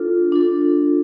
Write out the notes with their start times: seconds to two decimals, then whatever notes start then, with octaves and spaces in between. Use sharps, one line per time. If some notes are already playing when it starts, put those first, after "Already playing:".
Already playing: D4 F4 A4
0.32 D4 F4 A4